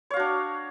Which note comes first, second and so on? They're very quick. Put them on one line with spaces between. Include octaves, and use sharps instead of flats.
C#5 F5 F#4 D4